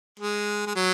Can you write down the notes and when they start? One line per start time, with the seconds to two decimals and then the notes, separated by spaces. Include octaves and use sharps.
0.20 G#3
0.67 G#3
0.76 F#3